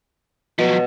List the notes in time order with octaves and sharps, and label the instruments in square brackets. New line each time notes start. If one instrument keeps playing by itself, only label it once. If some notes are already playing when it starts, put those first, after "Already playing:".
[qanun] B2 [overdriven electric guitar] F3 F#3